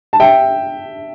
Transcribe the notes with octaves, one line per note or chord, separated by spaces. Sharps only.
A5
E5 G5